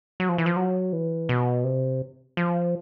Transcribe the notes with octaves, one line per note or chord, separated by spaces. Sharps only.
F#3
F3
E3
F3
F#3
E3
B2
C3
F3